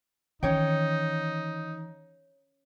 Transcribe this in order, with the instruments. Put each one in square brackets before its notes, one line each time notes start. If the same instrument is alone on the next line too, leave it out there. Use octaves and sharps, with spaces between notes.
[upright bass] D#3 E3 [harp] C#4 C#5 G5 [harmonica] D#4